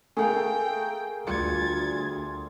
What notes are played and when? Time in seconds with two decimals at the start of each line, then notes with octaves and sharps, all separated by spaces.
0.17 A3 G#4 A#4 F5 G5
1.27 D2 G3 F4 G#6 A6 C#7